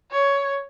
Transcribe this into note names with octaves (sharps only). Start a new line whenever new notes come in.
C#5